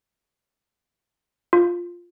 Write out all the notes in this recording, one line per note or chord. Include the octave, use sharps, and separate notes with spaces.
F4